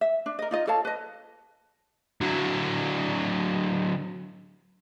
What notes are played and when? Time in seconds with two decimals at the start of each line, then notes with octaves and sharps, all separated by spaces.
0.01 E5
0.26 D4
0.39 A#4 D#5
0.51 D#4 F4 D#5
0.67 A4 C#5 F5 A5
0.85 B4 D#5
2.21 D3 F#3